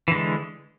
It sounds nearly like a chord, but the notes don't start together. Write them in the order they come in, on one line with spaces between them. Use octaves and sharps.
E3 D3 G#3